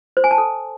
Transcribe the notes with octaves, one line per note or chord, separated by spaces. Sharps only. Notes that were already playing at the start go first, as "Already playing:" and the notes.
C5
G#5
A5
A4